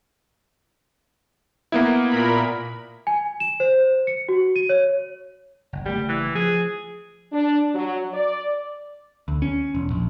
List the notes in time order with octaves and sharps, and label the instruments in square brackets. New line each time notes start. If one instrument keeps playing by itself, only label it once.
[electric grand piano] A#3 B3 E4
[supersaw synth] A#2 A#4 B5
[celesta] G#5
E7
C5
C#7
F#4
D#7
C#5
[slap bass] F#1
[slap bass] F#1 B2 A3 [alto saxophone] G3
[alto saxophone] E3
[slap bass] F3 [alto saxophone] G#4
[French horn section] D4
F#3
D5
[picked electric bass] D2
C#4
E1
A#1